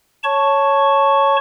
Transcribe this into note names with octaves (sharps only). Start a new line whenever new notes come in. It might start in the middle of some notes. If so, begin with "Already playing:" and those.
C#5 A5 C#6